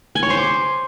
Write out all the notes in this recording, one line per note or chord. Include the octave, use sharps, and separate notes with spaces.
G#5
C#5
C5
D6